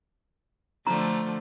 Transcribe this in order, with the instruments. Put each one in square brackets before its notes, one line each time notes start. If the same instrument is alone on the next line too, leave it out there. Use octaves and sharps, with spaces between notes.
[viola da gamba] D3 F3 A3 [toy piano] A#5